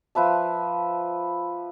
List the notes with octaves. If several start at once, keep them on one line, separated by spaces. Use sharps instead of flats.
F3 B4 E5 A5